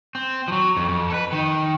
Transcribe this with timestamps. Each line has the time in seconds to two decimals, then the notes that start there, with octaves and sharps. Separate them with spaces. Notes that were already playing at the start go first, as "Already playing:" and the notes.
0.15 C4
0.48 F3 F#3
0.77 F2
0.89 F2
1.10 A4 B4
1.32 D#3